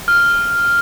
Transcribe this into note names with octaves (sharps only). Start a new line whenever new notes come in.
F6